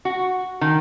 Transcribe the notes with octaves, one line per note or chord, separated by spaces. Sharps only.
F#4
D#3